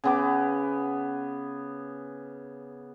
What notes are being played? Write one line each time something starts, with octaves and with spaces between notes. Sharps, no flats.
C#3 B3 D6